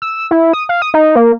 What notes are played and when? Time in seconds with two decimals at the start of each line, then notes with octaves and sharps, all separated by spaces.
0.02 E6
0.31 E4
0.53 D#6
0.69 F5
0.82 D#6
0.94 D#4
1.16 A#3